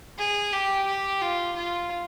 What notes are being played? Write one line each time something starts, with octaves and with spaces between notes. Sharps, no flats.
G#4
G4
G4
F4
F4